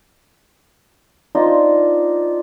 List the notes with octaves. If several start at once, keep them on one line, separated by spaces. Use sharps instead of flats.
D4 D#4 F4 C5